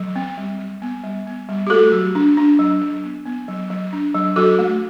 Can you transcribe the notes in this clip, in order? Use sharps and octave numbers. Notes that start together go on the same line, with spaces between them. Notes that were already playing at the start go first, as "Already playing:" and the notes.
Already playing: F#3
C4
G3
G3
B3
G3
B3
G3
G4
A3 F#4 A4
F#3
D4
D4
F#3
F#3
B3
B3
F#3
F#3
D4
F#3
F#3 F#4 A4
A3